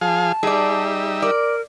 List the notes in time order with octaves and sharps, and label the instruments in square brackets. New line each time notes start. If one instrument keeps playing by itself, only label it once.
[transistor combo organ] F3 G#4 F5 [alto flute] A5
[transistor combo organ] G3 D#4 E5 [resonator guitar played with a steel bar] G#4 D5
[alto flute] A#4 [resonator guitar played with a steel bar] D5